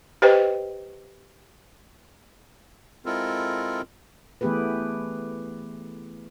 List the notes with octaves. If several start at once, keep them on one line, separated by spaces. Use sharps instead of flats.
G4 B4 C5 D#5 G5
G#3 C4 E4 F4 A4 A#4
E3 A3 B3 G4 G#4 B4